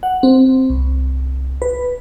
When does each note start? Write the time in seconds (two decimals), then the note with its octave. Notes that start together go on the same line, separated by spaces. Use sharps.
0.03 F#5
0.23 C4
0.70 C2
1.62 B4